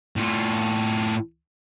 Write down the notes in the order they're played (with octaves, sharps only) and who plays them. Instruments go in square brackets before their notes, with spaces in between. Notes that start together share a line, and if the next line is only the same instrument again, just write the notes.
[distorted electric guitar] A2 F4